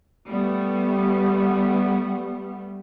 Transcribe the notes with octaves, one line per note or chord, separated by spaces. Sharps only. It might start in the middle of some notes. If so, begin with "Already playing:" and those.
G3 A3 B3